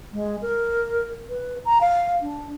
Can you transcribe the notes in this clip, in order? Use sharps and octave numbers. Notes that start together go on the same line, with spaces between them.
G#3
A#4
B4
A#5
F5
D4